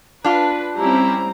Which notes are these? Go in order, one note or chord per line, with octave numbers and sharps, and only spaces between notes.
D4 F4 B4
G3 C4 C#4 E4 G4 A#5